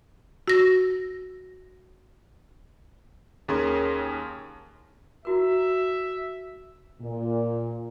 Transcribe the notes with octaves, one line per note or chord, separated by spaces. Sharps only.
F#4 A#6
D#2 C#4 G#4 A#4 C6
E4 F#4 A#4 E5
A#2